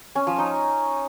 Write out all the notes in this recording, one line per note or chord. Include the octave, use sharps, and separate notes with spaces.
C#4
F3
D#4